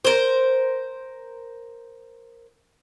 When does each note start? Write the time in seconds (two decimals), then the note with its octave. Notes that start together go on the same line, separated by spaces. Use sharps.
0.05 A#4 C5